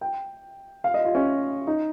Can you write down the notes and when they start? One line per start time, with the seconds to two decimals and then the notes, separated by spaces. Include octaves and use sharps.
0.01 G5
0.84 F5
0.94 D#5
1.05 F4
1.15 C#4
1.67 D#4